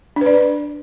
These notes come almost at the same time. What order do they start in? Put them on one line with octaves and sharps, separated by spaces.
D4 B4 D5